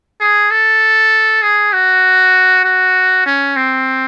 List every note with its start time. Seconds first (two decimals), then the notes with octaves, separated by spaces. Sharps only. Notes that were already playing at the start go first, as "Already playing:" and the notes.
0.20 G#4
0.51 A4
1.42 G#4
1.73 F#4
2.64 F#4
3.26 C#4
3.56 C4